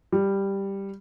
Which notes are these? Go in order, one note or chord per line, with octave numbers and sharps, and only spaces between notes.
G3